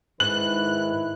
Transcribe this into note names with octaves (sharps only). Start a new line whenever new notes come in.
G#2 D#3 E4 B4 F#6 F#7